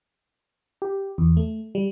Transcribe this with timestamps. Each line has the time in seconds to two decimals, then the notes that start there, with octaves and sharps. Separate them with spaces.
0.82 G4
1.18 E2
1.37 A3
1.75 G3